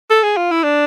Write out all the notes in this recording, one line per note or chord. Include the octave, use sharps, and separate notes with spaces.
A4
G#4
F4
E4
D4